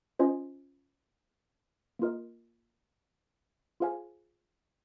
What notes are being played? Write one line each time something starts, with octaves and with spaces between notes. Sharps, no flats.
C#4 F4 C5 D#5 G#5
A#3 F4 A#4 D#5
F4 G#4 C5 F5 G#5